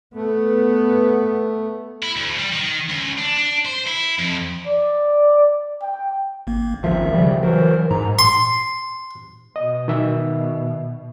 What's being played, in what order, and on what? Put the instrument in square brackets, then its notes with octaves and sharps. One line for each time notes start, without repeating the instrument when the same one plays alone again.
[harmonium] A3 [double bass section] B3
[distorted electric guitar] E4
D2
G3
D#3
C#2
D4
D4
C5
E4
F2
[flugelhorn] D5
G5
[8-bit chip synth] G#1 A#3
[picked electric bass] C#2 D#3 F3 [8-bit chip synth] E5
[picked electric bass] C#3 F3 G3
[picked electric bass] E3 F#3 [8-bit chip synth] A#4 C5
[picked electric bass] G#2 [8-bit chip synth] A#5
[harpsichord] C6
[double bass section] B2 [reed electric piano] D#5
[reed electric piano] D#3 E5